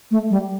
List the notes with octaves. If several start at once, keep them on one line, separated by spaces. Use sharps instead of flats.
A3
G3